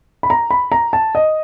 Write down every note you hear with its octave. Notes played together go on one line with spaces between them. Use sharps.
B5
A#5
B5
A#5
A5
D#5